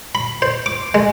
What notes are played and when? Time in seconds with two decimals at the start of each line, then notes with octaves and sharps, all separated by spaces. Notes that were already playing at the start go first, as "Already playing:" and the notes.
0.15 B5
0.42 C5
0.66 D6
0.94 G#3